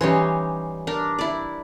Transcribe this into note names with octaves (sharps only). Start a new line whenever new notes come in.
E3 G3 C#4 D#4 C#5 C6
D4 A#4
E4 D5